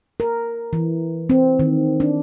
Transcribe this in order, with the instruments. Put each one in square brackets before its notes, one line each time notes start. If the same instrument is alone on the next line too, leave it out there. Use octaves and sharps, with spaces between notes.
[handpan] A#4
E3
C4
D#3
D4